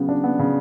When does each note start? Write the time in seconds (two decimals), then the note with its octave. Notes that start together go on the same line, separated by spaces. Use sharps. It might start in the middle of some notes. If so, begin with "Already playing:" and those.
Already playing: C#3 F#3 B3
0.09 D4
0.24 B3
0.39 C#3